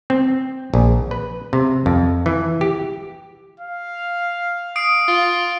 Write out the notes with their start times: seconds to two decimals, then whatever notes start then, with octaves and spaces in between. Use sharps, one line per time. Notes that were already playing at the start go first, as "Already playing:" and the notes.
0.10 C4
0.74 A#1
1.11 B4
1.53 C3
1.86 F2
2.26 E3
2.61 G4
3.60 F5
4.76 D#6 C7 D7
5.08 F4